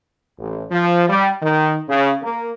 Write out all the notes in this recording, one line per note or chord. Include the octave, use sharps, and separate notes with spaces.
A1
F3
G3
D#3
C#3
A#3